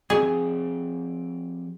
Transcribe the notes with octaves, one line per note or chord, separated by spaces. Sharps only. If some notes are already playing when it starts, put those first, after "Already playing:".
F3 C4 G4 G#4